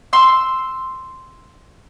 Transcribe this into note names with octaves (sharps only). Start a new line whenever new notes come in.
C6 E6